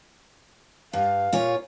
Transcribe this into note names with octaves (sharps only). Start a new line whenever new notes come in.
G2 F5
A#2 F4 C#5